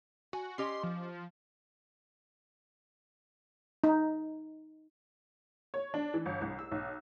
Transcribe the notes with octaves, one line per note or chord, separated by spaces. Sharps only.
F#4 G#5
C#4 G4 D#5 C6
F3
D#4
C#5
D4
E3
G1
C2
E6
B1